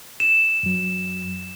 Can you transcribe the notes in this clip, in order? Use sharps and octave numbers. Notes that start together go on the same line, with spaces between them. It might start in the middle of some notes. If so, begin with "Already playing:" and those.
E7
F#2 F#3